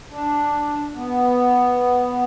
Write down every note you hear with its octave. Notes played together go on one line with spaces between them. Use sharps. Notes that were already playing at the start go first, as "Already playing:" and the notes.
D4
B3